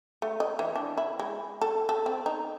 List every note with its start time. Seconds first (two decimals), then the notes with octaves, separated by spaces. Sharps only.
0.22 A3
0.40 D#5
0.59 E3
0.76 D4
0.98 E4
1.19 G#3
1.61 A4
1.89 A4
2.06 C4
2.26 D#4